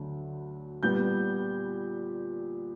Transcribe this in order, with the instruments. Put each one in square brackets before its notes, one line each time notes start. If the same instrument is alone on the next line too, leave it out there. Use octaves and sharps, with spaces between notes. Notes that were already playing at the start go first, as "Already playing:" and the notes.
Already playing: [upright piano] D2 D3 F#3
A#2 G3 B3 G6